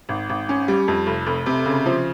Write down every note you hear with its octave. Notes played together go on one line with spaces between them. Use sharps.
G#1
G#1
C#4
G3
F2
F1
F1
C3
C#3
F3